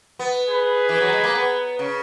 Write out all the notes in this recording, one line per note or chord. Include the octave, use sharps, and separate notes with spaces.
B3
G#4 B4
E3
F#3
G#3
A#3
B3
C#3